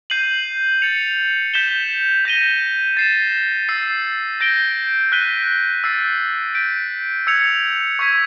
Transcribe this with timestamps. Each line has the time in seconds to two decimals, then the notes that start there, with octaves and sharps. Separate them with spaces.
0.10 G6 C7 D#7 F#7
0.82 A6 C#7 F7
1.54 G6 B6 E7 G7
2.25 G6 A#6 D#7 G7
2.97 A6 C7 E7
3.68 E6 A6 C7
4.41 G6 A#6 D7 G7
5.12 F#6 B6 D#7 G7
5.84 E6 A6 C7
6.55 G6 B6 D7
7.27 E6 G#6 C#7 F7
7.99 C#6 E6 G#6 B6